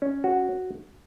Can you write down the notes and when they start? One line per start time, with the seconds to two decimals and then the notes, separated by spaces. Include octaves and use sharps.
0.02 C#4
0.24 F#4